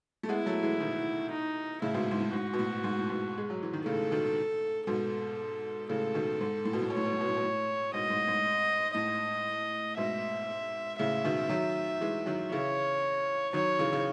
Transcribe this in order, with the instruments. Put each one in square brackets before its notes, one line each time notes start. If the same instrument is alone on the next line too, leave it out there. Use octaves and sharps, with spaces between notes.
[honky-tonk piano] A3
[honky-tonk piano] G#3 B3 [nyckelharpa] E4
[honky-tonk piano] F#3 A3
E3 G#3
B2 D#3
[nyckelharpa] D#4
[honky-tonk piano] A2 C#3 [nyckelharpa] E4
[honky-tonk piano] G#2 B2
G#2
A2
[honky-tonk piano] G#2 [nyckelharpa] F#4
[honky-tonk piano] B2
A2
G#2 B2
A2
G#2 B2
G#3
F#3
E3
D#3
[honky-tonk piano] A2 C#3 [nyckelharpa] A4
[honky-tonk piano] B2 D#3
[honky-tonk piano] G#2 B2 [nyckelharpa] A4
[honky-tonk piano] A2 C#3 [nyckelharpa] A4
[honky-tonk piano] B2 D#3
G#2
A2
B2
A2
[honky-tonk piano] B2 [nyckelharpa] C#5
[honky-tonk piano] A2
B2
A2
B2
A2
B2
A2
[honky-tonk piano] G#2 B2 [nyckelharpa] D#5
[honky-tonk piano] G#2
G#2
[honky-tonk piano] A2 [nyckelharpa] D#5
[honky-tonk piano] G#2 B2 [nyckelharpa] E5
[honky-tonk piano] A2 C#3 [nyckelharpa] E5
[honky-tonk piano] B2 D#3
D#3 F#3
E3 G#3
D#3 F#3
[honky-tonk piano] C#3 E3 [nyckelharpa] C#5
[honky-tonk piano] D#3 F#3 [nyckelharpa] C#5
[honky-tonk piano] C#3 E3
C#3